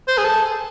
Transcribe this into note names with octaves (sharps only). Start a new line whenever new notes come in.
C5
G#4
A4